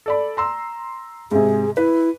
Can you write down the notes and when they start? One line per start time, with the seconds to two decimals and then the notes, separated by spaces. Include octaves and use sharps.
0.06 A4 D5 B5
0.37 A#5 C6 E6
1.31 G#2 C3 G#4
1.77 E4 B4